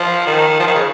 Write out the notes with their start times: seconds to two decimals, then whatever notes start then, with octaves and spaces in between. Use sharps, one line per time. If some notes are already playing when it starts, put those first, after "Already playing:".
Already playing: F3
0.27 D#3
0.60 F3
0.67 D#3
0.75 C#3